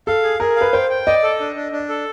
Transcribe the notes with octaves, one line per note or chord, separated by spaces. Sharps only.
A4 F5
G#4
G#4 A#4
B4 F5
C5 G5
G5
D5 D#5
A4
D4
D4
D4
A4